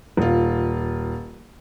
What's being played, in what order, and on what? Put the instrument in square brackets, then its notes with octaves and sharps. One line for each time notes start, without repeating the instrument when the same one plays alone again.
[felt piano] D#1 F4